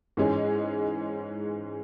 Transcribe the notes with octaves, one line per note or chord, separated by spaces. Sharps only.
G#2 E3 G#3 C#4 G#4